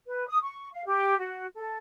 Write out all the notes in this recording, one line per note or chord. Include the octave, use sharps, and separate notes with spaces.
B4
D#6
C#6
F5
G4
F#4
A4